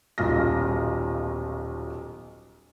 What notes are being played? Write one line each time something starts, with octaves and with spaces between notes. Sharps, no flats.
D#1 B1 F4 F6 A#6